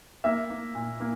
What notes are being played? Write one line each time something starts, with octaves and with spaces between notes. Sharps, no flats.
A#3 E5
A#3
A#2
A#3